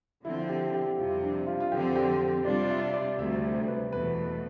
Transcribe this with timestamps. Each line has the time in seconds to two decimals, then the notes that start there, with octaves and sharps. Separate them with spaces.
0.25 D3 F3 C4 E4
0.49 G4
0.74 G4
0.98 F2 C3 G3 C4 F4
1.23 D4
1.47 F4
1.60 F4
1.71 F2 D3 F3 C4 G4
1.96 G4
2.45 C3 G3 D4 F4 D5
2.64 D5
2.70 E5
2.93 D5
3.18 D2 C3 G3 E5
3.43 C5
3.68 B4
3.92 E2 B2 A3 B4